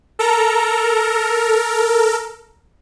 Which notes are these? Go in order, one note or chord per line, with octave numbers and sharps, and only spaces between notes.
A4 A#4 A#5